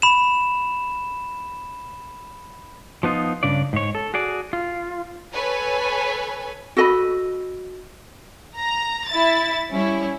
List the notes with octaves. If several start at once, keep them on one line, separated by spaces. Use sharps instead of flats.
B5 E7
F3 B3 D#4 F4
G2 C#3 D4 D5
G#2 C#5
A4
F#4 G#4 D5
F4
A4 B4 C#5 G#5
F#4 A4 D#5 B5
A#5
E4 A6
G3 C#4 E4